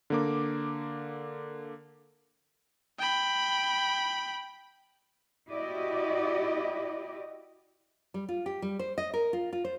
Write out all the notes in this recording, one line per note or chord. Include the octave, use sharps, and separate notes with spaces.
D3 A#3 D6
G5 B5
E4 F#4 G4 D5 D#5
G3
F4
G4
G3
C5
D#5
A#4
F4
F4
C5